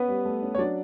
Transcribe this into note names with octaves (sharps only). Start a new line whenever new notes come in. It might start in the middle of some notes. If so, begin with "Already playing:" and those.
Already playing: B3 C#4 B4
G3
A3
C#4
C#5
F#3 D4 D5